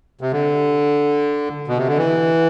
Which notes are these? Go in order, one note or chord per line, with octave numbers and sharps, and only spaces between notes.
C3
D3
B2
C3
D3
E3